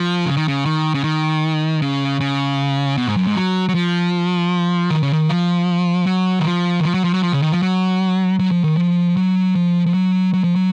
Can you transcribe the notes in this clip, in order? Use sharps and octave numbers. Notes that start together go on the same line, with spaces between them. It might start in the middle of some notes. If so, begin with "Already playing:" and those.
Already playing: F3
C#3
D#3
C#3
D#3
C#3
D#3
C#3
C#3
B2
G#2
F#2
G#2
F#3
F#3
F3
D#3
C#3
D#3
F3
F#3
D#3
F3
D#3
F3
F#3
F3
F#3
F3
C#3
D#3
F3
F#3
F#3
F3
D#3
F3
F#3
F3
F3
F#3
F#3
F3
F#3